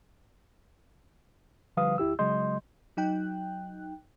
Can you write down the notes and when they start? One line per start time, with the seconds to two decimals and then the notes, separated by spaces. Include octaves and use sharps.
1.77 D3 F3 G3 B4 F5 D#6
1.98 D2 E4 G4 E6
2.19 C#3 F#3 G#3 D#5 C6 G6
2.97 F#3 D#4 G5 F#6